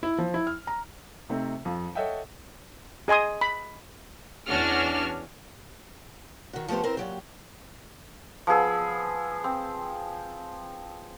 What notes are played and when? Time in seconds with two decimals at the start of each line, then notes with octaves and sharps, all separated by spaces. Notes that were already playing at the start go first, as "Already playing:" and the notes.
0.03 E4
0.18 F3
0.34 E4
0.47 F6
0.67 A#5
1.29 C3 A3 C4 D#4
1.65 F2 F3
1.95 A4 C#5 D#5 E5 F#5 G5
3.08 G#4 D#5 G#5 C6 D#6
3.41 B5
4.47 E2 C#4 D4 F#4 F6
6.53 D#3 F#4
6.68 F3 A3 B3 G4 C5
6.84 C4 E4 A#4 C5
6.97 A#2 F#3 G4
8.47 F3 B3 G#4 E6
9.44 C4